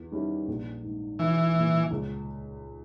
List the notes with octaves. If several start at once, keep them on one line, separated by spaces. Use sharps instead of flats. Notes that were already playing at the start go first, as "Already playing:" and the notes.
Already playing: E2
D#3 G3 C#4 E4
A#1
G#2 D#3
B1 E3
A#2 G3
C#2